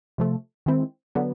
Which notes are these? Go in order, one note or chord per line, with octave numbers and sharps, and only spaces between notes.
C3 F3 A3
D#3 G#3 C4 E4
D3 F#3 B3